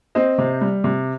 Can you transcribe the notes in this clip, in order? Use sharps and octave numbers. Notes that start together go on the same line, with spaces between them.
C4 C5 D#5
C3
G3
C3